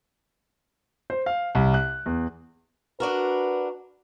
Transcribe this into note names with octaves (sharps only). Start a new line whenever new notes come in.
C5
F5
C2
F#6
E2
D4 F#4 A#4 B4